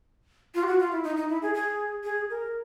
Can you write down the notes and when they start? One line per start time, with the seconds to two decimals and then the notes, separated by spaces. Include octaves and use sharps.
0.55 F4
0.63 G4
0.67 F#4
0.79 F4
0.92 E4
1.04 D#4
1.16 D#4
1.29 E4
1.42 G#4
1.55 G#4
2.04 G#4
2.30 A#4